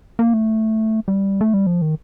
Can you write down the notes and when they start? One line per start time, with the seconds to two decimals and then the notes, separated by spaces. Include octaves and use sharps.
0.19 A#3
0.34 A3
1.08 G3
1.41 A3
1.54 G3
1.67 F3
1.82 D#3